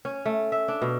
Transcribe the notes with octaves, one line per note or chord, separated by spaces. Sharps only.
C#4
A3
E5
D4
B2